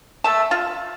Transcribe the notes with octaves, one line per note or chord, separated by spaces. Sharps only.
A3 A5
F4